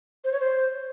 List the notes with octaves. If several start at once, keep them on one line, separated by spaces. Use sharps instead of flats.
C5
C#5
C5